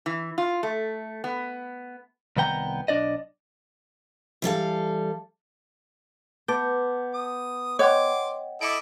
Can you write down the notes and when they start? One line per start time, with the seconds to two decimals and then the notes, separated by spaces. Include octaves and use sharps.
0.06 E3
0.38 F4
0.63 A3
1.24 B3
2.37 C2 D#3 B3 G5 A#5
2.88 B1 D4 D5 D#5
4.42 E3 G3 A4 F5
6.48 B3 A5 D6 G6
7.14 D#6
7.79 C#5 D#5 F#5 G5 C6 D6
8.61 E4 A4 D#5 D6 C#7 D7